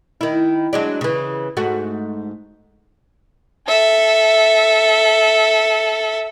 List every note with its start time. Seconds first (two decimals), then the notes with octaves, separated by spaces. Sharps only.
0.21 D#3 E4
0.73 F#3 G#3 D4
1.01 C#3 E3
1.57 G#2 A3 F#4
3.67 A4 E5